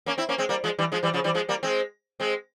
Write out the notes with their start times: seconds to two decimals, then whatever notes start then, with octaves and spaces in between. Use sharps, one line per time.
0.06 A#3 C#4
0.18 C4 E4
0.29 A#3 C#4
0.38 G#3 C4
0.49 G3 A#3
0.64 F3 G#3
0.79 E3 G3
0.92 F3 G#3
1.03 E3 G3
1.14 C#3 F3
1.24 E3 G3
1.34 F3 G#3
1.49 G3 A#3
1.63 G#3 C4
2.20 G#3 C4